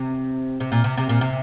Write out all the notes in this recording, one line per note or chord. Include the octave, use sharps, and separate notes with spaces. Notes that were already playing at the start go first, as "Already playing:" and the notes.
Already playing: C3
C3
A#2
C3
C3
A#2
C3